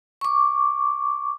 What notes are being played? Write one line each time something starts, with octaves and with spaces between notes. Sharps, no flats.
C#6 D6